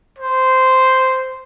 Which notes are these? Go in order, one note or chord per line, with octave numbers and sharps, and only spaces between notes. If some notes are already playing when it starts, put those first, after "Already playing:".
C5